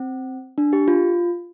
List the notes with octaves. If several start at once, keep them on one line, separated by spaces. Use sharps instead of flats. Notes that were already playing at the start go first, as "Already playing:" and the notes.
Already playing: C4
D4
G4
F4